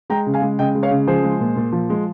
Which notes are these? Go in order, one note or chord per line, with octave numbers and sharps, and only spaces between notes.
G#3 G5 A#5
C#3
F5 G#5
G#3
C#3 D#5 G5
G#3
C#5 F5
C#3
F3 G#4 C5
G#3
A#2
A#2
F3
G#3